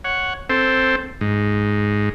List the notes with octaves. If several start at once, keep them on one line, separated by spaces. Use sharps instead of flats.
C#5 F#5
C4 A4 C5
G#2